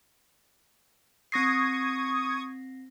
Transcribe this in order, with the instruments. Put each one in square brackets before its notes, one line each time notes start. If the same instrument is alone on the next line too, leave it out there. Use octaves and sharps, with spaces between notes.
[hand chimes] C4 A#6 C7 [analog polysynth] C#6 D#6 G#6